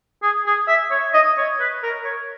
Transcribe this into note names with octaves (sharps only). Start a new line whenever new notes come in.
G#4
G#4
E5
C#5
D#5
C#5
B4
A#4
C#5